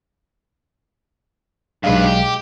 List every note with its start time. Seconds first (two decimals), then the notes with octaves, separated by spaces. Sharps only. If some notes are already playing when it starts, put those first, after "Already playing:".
1.84 B1 G2 G#3 B4 F5
2.06 G4